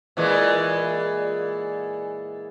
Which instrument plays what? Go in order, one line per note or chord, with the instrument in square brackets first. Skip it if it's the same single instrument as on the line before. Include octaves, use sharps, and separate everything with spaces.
[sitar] A#2 E3 G#3